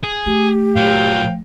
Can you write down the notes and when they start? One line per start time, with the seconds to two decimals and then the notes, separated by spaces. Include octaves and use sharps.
0.04 G#4
0.26 A3 G4
0.76 A#2 F#3 F5 G5